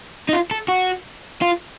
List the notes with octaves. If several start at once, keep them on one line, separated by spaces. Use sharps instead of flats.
D#4
F4
A4
F#4
F4